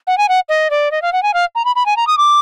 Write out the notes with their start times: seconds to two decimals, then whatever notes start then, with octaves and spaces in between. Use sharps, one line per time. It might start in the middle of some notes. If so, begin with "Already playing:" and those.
0.07 F#5
0.18 G#5
0.29 F#5
0.49 D#5
0.70 D5
0.91 D#5
1.02 F5
1.12 F#5
1.23 G#5
1.34 F5
1.55 A#5
1.65 B5
1.76 B5
1.86 G#5
1.97 A#5
2.07 D#6
2.18 D6